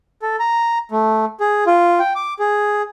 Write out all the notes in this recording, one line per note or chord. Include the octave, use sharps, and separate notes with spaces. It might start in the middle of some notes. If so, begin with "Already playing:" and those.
A4
A#5
A3
G#4
F4
G5
D6
G#4